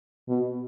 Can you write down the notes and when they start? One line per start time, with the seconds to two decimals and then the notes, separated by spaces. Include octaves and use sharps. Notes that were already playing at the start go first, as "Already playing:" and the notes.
0.29 B2